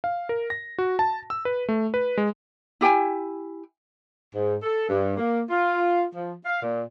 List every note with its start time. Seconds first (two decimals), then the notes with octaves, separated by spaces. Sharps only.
0.04 F5
0.29 A#4
0.50 A#6
0.78 F#4
0.99 A5
1.30 E6
1.45 B4
1.69 A3
1.94 B4
2.17 G#3
2.81 E4 G4 G5 G#5
4.34 G#2
4.63 A4
4.89 G2
5.18 A#3
5.50 F4
6.15 F3
6.46 F5
6.63 A#2